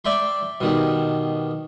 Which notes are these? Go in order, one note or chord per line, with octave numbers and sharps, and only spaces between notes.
D5 E5 G5 B5 C6
B2 D#3 G3